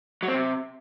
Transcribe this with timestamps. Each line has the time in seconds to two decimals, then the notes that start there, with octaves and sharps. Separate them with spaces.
0.23 F#3
0.28 C4
0.34 C3